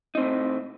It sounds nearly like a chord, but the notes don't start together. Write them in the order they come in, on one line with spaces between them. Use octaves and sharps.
D#4 C4 A2